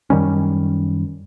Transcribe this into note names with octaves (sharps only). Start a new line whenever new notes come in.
F#2 D#3 G3 C#4